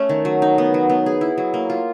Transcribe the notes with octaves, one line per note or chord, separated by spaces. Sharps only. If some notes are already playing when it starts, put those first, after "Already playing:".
Already playing: A3 C#4
D#3
F#3
D#4
B3
F#3
B3
G#4
E4
F#3
A#3
F4